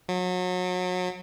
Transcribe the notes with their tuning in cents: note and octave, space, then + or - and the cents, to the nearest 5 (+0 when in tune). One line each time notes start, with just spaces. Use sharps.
F#3 -30